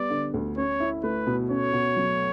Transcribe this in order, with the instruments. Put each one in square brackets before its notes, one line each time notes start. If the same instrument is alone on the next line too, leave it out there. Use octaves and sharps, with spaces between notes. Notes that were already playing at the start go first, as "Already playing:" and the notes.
Already playing: [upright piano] G3 B3 [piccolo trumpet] D5
[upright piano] D3
D2
[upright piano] C#4 [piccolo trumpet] C#5
[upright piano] E4
[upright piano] A3 [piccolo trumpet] B4
[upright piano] B2
[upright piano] C#4 [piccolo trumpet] C#5
[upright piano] B2
F#3